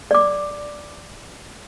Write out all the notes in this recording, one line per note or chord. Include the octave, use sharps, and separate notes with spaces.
D5 D6